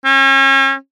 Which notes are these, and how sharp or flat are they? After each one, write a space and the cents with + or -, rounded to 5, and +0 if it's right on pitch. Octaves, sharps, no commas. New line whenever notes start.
C#4 -40